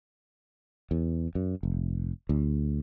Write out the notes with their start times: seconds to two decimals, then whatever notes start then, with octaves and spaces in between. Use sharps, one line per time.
0.91 E2
1.35 F#2
1.63 F1
2.29 D2